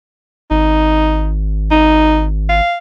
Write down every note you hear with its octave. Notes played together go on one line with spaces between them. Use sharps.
G#1 D#4
D#4
F5